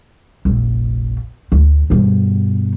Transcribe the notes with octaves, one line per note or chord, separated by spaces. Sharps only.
F1 A#1
D2
G2 B2